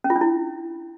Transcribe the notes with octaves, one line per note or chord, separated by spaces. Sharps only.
C#4
F4
D4
E4